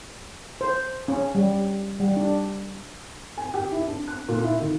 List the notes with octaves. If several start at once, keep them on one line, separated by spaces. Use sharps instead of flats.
C5
C#4
G3
G3
D4
G#5
G4
E4
D4
F#6
A#2
E4
D#3